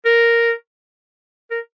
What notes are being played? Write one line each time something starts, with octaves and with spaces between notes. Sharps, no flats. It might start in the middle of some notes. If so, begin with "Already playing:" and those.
A#4
A#4